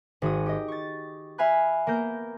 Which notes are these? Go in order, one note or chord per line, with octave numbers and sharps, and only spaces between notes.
G#1 F#4 D#6
G4 D#5
C#6 A6
E5 F5 G#5 B5 F#6
A#3 B3 A#4 G6